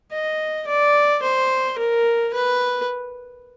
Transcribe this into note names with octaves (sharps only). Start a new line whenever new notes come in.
D#5
D5
C5
A#4
B4